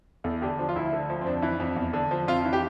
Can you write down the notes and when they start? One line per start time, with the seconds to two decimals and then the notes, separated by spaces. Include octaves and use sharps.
0.24 E2 A4
0.42 D3 G4
0.59 F3 D4
0.69 F4
0.76 D2 E4
0.93 D3
1.09 F3
1.21 C4
1.26 F2 D4
1.42 E3
1.60 F2
1.76 E2
1.93 D3
2.11 F3
2.27 F2 F4
2.45 E3
2.53 G4